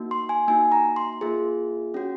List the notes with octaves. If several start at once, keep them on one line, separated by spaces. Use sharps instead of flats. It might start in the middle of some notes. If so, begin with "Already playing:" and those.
Already playing: A#3 D#4 F#4
C6
G#5
A#3 D#4 F#4 G#5
A#5
C6
A#3 F4 G#4
C#4 F#4